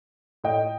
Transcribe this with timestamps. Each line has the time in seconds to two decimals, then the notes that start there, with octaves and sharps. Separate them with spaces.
0.44 A2 D#5 G5